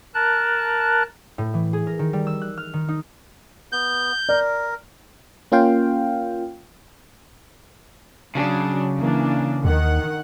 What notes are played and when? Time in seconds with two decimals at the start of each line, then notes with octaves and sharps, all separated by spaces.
0.14 A#4 A5 F#6
1.38 A2
1.54 E3
1.73 G#4
1.87 A#4
1.99 D#3
2.13 G3
2.27 E6
2.41 F#6
2.57 F6
2.73 D#3
2.88 D#4
3.72 B3 G6
4.29 A#4 D5
5.52 A#3 C#4 F4 F5 G5
8.35 C#3 F#3 D4
8.99 E3 A#3 D4
9.65 D#2 D#3 F#5